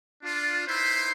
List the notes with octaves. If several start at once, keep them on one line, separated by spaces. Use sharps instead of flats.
D4 F4
D#4 E4 B4 C5 E5 C6